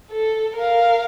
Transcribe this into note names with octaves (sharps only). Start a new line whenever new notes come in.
A4
A#4 F5